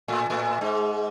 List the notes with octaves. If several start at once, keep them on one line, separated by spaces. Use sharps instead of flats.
A2 A3
A2 A3
G#2 G#3